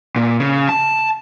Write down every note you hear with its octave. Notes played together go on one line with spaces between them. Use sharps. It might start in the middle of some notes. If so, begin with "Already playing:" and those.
A#2
C#3
A5